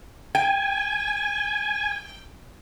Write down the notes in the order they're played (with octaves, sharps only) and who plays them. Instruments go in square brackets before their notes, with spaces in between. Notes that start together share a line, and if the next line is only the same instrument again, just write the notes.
[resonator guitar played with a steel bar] G5 [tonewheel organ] G#5